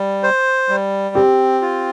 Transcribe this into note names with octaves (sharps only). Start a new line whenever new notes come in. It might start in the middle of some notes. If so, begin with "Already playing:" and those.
Already playing: G3
C5
G3
C4 G4
F4